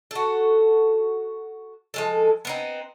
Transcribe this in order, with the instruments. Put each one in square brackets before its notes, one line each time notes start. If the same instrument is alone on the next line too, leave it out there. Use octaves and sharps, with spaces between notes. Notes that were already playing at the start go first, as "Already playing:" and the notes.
[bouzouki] F#4 A4
F3 G#3 A4
B3 C4 D#4